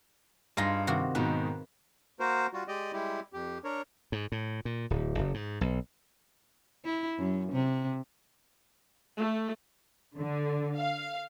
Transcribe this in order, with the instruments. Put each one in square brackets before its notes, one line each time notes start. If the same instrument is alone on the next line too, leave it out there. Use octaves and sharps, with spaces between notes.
[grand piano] G2 A#6 [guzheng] D#4 F4 G#4
[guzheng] C3 D#3 F#4
[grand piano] G#2 B2 D#3 [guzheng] B4
[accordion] A#3 F#4 A#4 C5
G3 F4 F#4
G#3 G4 D5 D#5
G3 G#3 E4 G4
F2 G4
D4 A#4 C#5
[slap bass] G#2
A2
A#2
D1
F#1
G#2
B1
[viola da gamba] E4
F#2
C3
[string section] A3
D3
F5